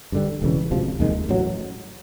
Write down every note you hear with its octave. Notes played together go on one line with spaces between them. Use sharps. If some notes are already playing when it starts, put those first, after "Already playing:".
G2 D3 G3
E1 D2 C#3 E3
E1 D2 C3 F3
F1 D#2 D#3 G#3
A1 A2 F#3